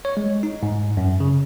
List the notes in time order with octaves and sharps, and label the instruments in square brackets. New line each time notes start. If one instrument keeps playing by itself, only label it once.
[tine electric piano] C#5
G#3
D#4
G#2
F#2
C#3